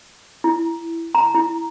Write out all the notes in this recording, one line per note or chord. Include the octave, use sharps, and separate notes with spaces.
E4
A#5
E4